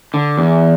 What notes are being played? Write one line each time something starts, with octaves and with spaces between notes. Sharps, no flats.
D3
E2